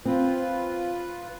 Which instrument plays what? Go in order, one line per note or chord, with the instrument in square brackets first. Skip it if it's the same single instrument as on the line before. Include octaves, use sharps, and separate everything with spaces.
[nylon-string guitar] C4 [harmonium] F4 B4